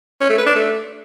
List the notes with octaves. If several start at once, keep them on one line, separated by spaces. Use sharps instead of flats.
C#4
A3
B4
D4
A3